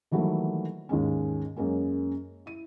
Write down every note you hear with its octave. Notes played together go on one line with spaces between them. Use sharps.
D#3 E3 F#3 G3 A3 A#3
D#2 G#2 G#3 C#4
F#2 G#3 A#3 C#4
E4 D#7